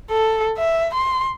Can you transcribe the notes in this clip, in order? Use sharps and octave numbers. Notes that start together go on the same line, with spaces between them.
A4
E5
C6